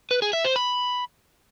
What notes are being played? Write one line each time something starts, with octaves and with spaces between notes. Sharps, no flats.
B4
G#4
E5
C5
B5